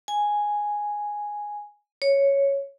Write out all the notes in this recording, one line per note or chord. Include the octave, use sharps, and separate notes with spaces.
G#5
C#5